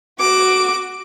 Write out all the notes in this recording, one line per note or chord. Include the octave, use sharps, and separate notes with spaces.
F#4 D6